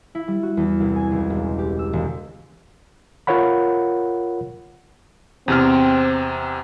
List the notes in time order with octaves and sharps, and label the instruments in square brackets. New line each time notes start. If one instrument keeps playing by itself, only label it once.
[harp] E4
G3
F#4
E2
C2
G#5
C#2
E1
G4
E6
E1
[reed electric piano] F4 A#4 C#5 F#5 B5
[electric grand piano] E2 C3 F6 [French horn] C4